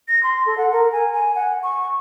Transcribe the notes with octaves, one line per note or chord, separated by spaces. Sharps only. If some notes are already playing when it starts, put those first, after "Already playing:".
A#6
C6
A4
F#5
A#4
G#5
G#5
F#5
C#6